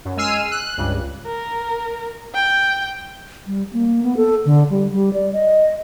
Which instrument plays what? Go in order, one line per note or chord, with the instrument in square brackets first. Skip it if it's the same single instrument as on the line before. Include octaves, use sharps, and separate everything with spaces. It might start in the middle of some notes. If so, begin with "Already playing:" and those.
[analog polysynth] F#2
G#3 G#5 E6 F6 C7 D#7
F#6
C#2 G2
[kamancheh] A#4
G5
[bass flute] G3
A#3
B3
A4
D3
G3
G3
D5
D#5